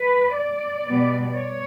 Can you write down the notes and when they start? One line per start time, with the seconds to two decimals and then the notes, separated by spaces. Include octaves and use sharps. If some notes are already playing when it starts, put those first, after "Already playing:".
Already playing: B4
0.36 D5
0.86 B2 G3 B3
1.35 C#5